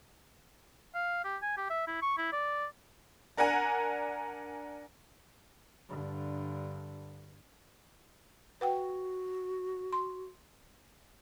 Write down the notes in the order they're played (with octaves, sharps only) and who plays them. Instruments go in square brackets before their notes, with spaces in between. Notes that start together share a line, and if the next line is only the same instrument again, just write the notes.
[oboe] F5
G4
G#5
G4
E5
E4
C#6
E4
D5
[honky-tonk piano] D4 A#4 F#5 G#5 A#5
[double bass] G2 D3
[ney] F#4 [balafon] B4 F#5 G5
[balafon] C6